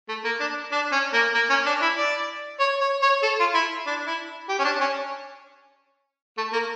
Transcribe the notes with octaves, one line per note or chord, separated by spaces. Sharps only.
A3
A#3
D4
D4
C#4
A#3
A#3
C#4
D4
E4
D5
C#5
C#5
C#5
A4
F4
E4
D4
E4
G4
C#4
D4
C#4
A3
A#3